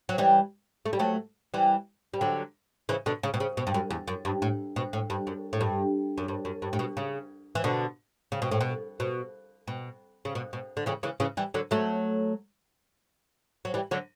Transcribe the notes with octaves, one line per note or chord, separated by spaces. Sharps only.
F#3
E3 G3
A3
G3
F#3 A3
E3 G3
G3
D3 F#3
C#3 E3
B2 D3
C#3
B2
C#3
B2
G2
F#2
E2
F#2
G2
A2
B2
A2
G2
F#2
A2
G2
F#2
G2
F#2
G2
A2
B2
C#3
E3
B2 D3
C#3
B2
A2
B2
B2
B2
C#3
B2
B2
D3
C#3 E3
C#3 E3
C#3 E3
E3 G3
D3 F#3
F#3 A3
F#3
E3 G3
D3 F#3